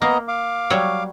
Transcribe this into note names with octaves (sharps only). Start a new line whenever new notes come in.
A#3 B3 D#5 A#5
F5 D6
F#3 G3 C#5